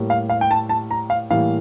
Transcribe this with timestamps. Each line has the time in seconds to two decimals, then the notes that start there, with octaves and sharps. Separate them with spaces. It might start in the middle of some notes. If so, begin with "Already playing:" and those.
Already playing: A2 G3 A#3
0.10 F5
0.30 F5
0.41 G5
0.51 A5
0.69 A5
0.91 A#5
1.10 F5
1.30 A2 E3 G3 A#3 F5